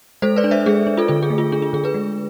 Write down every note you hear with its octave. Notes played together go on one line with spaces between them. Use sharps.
G#3 A4 C5
B4 D5
D4
C5 E5
G#3 G#4
D4
F4 A4
D3 F4 A4
G#4
A3
F4
D4 G#4
F4
D3 G#4
G#4 B4
G#3